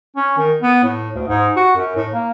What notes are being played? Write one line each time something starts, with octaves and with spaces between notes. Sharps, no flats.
C#4
D#3
B3
A2
D2
G#2
F#4
F#2
A2
A#3